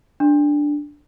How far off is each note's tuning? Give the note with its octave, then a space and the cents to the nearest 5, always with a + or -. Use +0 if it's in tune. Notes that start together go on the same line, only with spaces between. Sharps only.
D4 +0